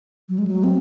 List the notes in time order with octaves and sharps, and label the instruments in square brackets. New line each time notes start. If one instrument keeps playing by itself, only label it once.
[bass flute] F#3
G#3
F#3
C4